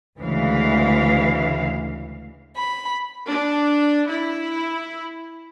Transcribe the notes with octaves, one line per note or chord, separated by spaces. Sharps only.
D2 C#3 E3 G#3 F5
B5
D4
E4